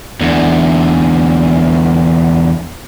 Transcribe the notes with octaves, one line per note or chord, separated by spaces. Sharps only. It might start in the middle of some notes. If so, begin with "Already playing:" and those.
E2 D3